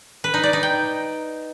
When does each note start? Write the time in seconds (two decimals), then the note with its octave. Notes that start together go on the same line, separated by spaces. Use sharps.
0.24 B4
0.34 D#4
0.43 D5
0.53 D#4
0.63 G5